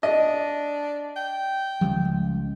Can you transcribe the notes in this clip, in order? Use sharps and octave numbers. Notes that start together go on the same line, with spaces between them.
D4 D#5
G5
C#2 F3 G3